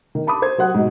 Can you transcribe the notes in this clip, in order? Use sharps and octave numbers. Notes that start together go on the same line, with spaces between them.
D#3
A5 B5 D6 D#6
C5 G#6
F#3 C5 F#5 F#6
G#2 B2